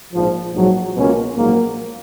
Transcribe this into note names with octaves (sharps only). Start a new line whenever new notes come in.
A#1 G#2 F3
A#1 G#2 F#3
C#2 B2 A#3 C#4 F4
A#1 G#2 F#3 A#3